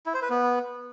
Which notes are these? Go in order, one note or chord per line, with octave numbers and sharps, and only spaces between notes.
E4
C5
B4
B3